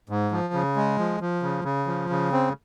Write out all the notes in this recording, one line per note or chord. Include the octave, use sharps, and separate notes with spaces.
G#2
F3
C#3
G#3
F3
F3
C#3
C#3
F3
C#3
C4